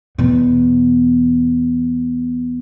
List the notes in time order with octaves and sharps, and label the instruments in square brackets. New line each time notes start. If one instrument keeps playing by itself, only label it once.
[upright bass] E2 B2